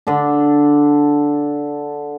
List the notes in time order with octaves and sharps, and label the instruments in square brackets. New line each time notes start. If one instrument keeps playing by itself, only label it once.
[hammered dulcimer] D3 D4